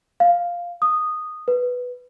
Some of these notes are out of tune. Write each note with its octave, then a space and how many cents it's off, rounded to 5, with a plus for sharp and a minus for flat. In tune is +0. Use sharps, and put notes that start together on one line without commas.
F5 +0
D#6 -10
B4 +0